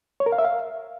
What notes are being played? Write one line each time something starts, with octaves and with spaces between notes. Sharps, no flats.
C#5
A#4
F5
E5
F5